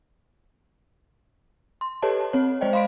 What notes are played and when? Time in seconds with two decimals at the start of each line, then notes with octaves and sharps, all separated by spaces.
1.81 C6
2.02 G4 A4 B4 C#5 D#5 A5
2.20 A5
2.33 C4 C#5
2.61 G#3 C5 D5 D#5 G5
2.73 F5 B5 C6 B6 D7